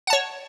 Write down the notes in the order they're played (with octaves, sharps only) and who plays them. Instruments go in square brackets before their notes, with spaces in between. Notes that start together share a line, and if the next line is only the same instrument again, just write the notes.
[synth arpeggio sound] F#5
A5
C#5